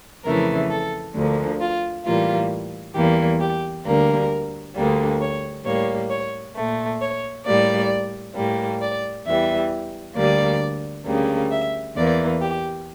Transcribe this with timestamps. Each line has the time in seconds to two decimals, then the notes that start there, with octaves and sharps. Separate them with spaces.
0.24 F2 C#3 E3 A3 A#4
0.70 A4
1.14 D2 D3 F3 A#3
1.60 F4
2.05 A2 E3 G3 A#3 F4
2.94 E2 E3 G3 A#3 G4
3.40 G4
3.85 D2 D3 G3 A#3 A#4
4.76 D2 D3 G3 A#3
5.20 C#5
5.65 A2 G3 A#3 C#5
6.10 C#5
6.55 A#2 A3
7.01 C#5
7.45 A2 G3 A#3 D5
8.35 A2 G3 A#3
8.81 D5
9.26 E2 E3 G3 E5
10.15 D2 D3 G3 A#3 D5
11.05 D2 C#3 G3 A#3
11.50 E5
11.96 E2 E3 A#3 D5
12.41 G4